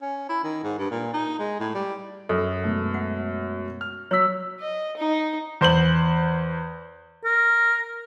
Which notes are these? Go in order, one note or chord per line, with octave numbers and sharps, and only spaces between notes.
C#4
E4
D#3
G#2
G2
A#2
D#4
G#3
A2
G3
F#2 A4
B2 G#3 A3
F#5
F6
F#3 C#5 E6 B6
D#5
D#4
E2 C5 G6 F#7
A#4